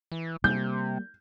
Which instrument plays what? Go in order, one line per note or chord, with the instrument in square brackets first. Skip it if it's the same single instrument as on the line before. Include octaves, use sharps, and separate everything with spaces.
[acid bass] E3
[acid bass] C3 [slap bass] G3 A#3 [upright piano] G6